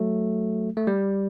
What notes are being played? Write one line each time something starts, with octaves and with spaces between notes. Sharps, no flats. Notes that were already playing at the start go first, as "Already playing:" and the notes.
Already playing: F#3 A3
A3
G3